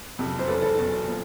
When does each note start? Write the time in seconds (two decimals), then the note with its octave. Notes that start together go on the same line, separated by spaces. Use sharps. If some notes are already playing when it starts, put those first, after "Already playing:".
0.19 F#1 F2 C3
0.39 C5
0.48 F#1 E2 C#3 A4 B4
0.62 A4
0.77 F#1 E2 B2
1.08 A#2 F3